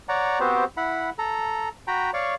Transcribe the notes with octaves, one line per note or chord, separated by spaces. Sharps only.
C#5 D5 F#5 A#5
B3 C4 F#4 G4 C5
E4 F#5 B5
A4 A#5
F#4 G5 A#5 B5
C#5 D5 F5 C#6